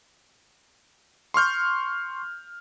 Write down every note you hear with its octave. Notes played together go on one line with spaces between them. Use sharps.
C6 C#6 F6 G6